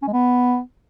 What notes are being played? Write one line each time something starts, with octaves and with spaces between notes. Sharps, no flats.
C#4
G#3
B3